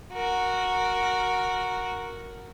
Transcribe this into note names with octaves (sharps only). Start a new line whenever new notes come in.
F#4 A#4